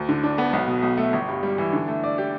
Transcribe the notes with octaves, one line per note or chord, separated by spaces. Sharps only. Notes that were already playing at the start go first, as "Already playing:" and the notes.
Already playing: D2
D3
D4
B3
B1
B2
B1
A3
G1
G2
G3
E3
D3
A3
D5
G4